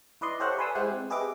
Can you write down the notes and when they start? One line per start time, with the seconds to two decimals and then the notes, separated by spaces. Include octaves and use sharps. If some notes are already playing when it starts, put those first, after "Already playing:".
0.21 E4 B4 D5 D#5 C6
0.40 G4 A4 C5 C#5 E5 F#5
0.58 B4 D5 G#5 C6 D#6 E6
0.75 G#3 E4 G4 C5 F#5
0.87 C4
1.10 G4 G#4 B4 D#5 E5 D6